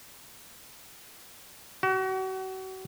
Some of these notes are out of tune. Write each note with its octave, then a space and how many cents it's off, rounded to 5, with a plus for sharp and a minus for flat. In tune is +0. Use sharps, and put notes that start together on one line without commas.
F#4 +35